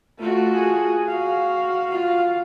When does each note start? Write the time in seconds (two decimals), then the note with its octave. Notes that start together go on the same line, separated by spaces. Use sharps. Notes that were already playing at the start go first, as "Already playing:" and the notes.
0.19 A3 F4 F#4
0.54 G#4
1.07 F#4 F5
1.90 F4 F5